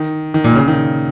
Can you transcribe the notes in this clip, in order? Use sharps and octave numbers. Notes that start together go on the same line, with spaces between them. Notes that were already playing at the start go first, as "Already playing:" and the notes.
Already playing: D#3
D#3
A#2
C#3
D#3